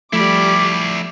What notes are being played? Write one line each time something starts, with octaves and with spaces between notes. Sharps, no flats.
F3 G3 A3 E4 D5 B5 D6